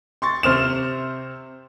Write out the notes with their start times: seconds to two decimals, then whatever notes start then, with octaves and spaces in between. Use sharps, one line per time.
0.22 C6 C#6 A6
0.43 C3 C5 F6 E7